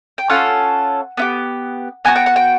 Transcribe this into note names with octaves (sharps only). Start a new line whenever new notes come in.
G5
C#4 F4 A4 F#5
B3 E4 G4
B3 D4 F#4 G#5
G5
F#5
G5